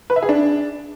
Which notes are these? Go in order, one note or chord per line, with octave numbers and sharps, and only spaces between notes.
B4
E5
G#4
D4